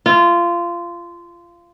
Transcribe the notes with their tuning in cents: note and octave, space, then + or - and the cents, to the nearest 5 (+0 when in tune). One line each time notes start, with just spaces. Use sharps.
F4 -20